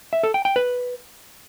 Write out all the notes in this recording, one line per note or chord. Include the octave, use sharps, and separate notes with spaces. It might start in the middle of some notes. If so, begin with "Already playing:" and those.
E5
A4
G5
G5
B4